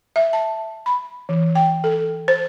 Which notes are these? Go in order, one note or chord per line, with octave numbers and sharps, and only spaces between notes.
E5
A5
B5
E3
G5
A4
C5